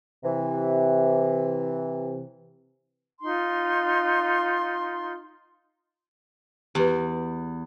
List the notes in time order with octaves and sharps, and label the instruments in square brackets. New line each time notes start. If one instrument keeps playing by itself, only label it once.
[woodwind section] C3 E3
[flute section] D#4 F4 C6
[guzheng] E2 [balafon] G4 B4